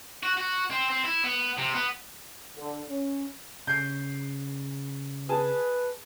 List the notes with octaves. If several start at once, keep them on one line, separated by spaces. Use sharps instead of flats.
F#4
F#4
C4
C4
E4
B3
C3
B3
D3
C#4
C#3 G6 C7
G#4 B4 G#5 A5